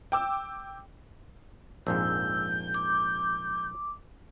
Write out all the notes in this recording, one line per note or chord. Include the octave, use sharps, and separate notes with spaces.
G5 D6 E6
A#1 F2 G#2 E6 G6
D6